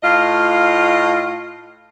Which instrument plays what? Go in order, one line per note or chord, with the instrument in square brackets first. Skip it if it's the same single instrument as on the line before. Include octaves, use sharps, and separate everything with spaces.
[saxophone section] A2 F4 D#5 F5